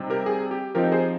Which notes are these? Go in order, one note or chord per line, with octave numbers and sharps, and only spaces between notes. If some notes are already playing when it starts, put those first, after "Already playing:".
Already playing: C3 G3 C4 D#4
G4 A#4
G#4
G4
F3 C4 D#4 G4 A#4
G#4 C5